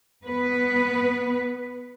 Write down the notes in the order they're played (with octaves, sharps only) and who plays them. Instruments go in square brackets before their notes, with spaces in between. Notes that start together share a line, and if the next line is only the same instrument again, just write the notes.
[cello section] B3 B4